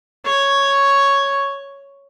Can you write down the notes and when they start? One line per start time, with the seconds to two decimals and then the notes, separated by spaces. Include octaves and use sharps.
0.25 C#5